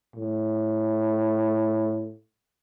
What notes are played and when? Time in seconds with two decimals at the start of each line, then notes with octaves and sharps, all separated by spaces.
0.16 A2